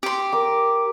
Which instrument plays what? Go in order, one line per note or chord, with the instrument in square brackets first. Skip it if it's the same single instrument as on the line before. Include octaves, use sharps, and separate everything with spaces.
[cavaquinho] G4 C6
[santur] A#4 D6